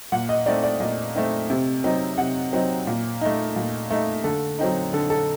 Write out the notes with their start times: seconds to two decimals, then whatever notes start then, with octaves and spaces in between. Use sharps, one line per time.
0.12 A#2 F#5
0.29 D#5
0.46 A3 C4 D#4 D5
0.63 D5
0.80 A#2 D#5
1.15 A3 C4 D#4
1.50 C3
1.84 F#3 C4 D#4
2.18 C3 F#5
2.53 F#3 C4 D#4
2.87 A#2
3.21 A3 D#4
3.56 A#2
3.91 A3 D#4
4.24 D3 A4
4.59 F#3 C4 D#4
4.93 D3 A4
5.10 A4